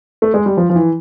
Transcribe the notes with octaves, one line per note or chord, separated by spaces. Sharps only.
A3
G#3
G3
F3
F3
E3